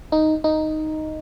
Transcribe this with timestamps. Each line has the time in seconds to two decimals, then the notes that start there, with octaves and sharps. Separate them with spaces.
0.12 D#4
0.44 D#4